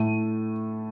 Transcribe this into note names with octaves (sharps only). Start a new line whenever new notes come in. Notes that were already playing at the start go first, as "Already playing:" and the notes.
Already playing: A2 A3 D#7